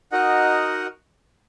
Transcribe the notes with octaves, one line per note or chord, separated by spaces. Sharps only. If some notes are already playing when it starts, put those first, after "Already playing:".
D#4 F#4 A#4 D#5 F#5